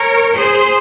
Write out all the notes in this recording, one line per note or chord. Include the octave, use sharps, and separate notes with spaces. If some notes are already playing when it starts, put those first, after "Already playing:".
Already playing: A#4 C#5
G#4 C5